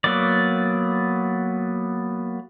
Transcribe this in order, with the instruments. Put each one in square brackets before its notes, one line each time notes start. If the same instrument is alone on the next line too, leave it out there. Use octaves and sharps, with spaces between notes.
[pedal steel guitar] F#3 A#3 B3 D5